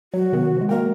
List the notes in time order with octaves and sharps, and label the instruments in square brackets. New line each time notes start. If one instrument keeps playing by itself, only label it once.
[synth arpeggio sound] F#3 [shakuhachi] F#4
[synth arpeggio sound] C3 D#3 B3
F3 G#3
[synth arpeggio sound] G#3 A#3 G5 [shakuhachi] A#4